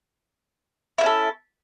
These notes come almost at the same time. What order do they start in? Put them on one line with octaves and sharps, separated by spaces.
E4 A#3 C#4 A4